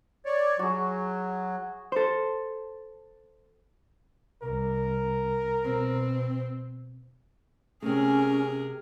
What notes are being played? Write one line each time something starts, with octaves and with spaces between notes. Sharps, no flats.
C#5 D5
F#3 F#4 G#4
A4 C5
C2 A#4
B2 C4
C3 A3 C#4 G#4 A#4